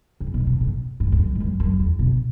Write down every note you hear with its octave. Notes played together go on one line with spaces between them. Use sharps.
C#3
B2
B2
A2
G#2
E2
F#2
G#2
F#2
F#2
E2
B2